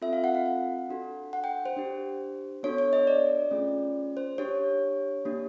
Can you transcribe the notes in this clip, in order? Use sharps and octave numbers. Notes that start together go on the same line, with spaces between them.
C4 F4 A4 E5
F5
F#5
F5
F#5
D4 F#4 A4
F#5
G5
C5
D4 G4
B3 D4 F#4 A4 C#5
C#5
D#5
D5
A3 C#4 F4 G#4
C5
D4 G4 C#5
A#3 D4 G4